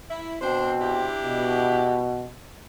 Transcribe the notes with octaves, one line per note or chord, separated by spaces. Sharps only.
E4
B2 C4 D4 C5
D4 E4 G4
B2